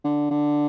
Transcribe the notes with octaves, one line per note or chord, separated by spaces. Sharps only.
D3
D3